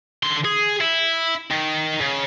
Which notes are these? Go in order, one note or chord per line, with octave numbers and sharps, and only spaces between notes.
D3 C6
G#4
E4
D#3
C#3